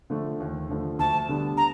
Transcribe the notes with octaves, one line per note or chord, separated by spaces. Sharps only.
D3 F3 A3
D#2
D3 F3 A3
D2 A5
D3 G3 B3 D4
A#5